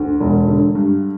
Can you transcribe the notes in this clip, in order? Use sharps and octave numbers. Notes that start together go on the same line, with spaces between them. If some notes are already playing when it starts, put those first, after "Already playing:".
Already playing: D2
E1
D3
G2